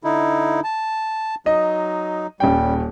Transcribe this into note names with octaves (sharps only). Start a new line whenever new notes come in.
D3 D#4 E4
A5
F#3 D#4 D#5
D#1 G3 C#4 G5